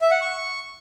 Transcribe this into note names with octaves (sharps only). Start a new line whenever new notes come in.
E5
F#5
C#6